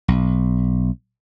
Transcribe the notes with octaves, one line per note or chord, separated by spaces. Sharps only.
B1